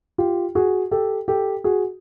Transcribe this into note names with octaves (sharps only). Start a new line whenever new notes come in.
F4 G4
F#4 G#4
G4 A4
G4 A4
F#4 G#4